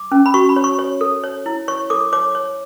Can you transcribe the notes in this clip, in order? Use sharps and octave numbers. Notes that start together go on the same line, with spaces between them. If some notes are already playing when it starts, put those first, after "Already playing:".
Already playing: D6
C#4
B5
F#4 C#6
B5
C#5
C#6
C#5
A4
C#5
E4
C#5 C#6
A4 D6
C#5 D6
C#5